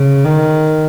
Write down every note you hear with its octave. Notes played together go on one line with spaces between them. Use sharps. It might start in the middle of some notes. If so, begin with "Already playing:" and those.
Already playing: C#3
D#3